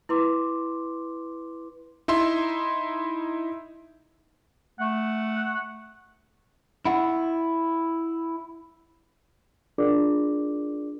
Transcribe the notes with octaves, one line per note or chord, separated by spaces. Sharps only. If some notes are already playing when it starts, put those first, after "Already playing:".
E4 B4 C6 D6
D#4 E4 E5 C6
A3 F#5
E4 F#5
D4 F4 G#4 A#4 D5 D6